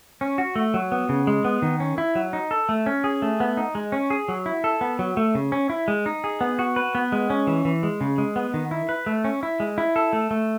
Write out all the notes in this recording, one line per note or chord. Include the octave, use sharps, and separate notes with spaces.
C#4
F#4
A3
F#3
B3
C#3
G#3
B3
D#3
C#4
E4
F#3
D#4
A4
A3
C#4
G#4
A3
B3
D#4
G#3
C#4
G#4
F#3
E4
A4
B3
F#3
A3
C#3
C#4
E4
G#3
D#4
G#4
B3
F#4
B4
B3
G#3
C#4
E3
E3
G#3
C#3
G#3
B3
D#3
E4
B4
A3
C#4
E4
G#3
E4
A4
A3
A3